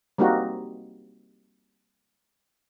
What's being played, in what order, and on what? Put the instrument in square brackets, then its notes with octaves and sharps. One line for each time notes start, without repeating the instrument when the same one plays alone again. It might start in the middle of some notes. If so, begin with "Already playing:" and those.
[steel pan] G3 A#3 C4 D#4 F#4